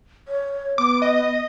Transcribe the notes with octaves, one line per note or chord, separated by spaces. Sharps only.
C#5
B3 D6
D#5